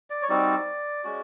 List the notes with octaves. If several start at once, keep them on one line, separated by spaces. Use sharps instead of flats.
D5
C#5
G3 C4 D#4 F#4 D5
G#3 C#4 F#4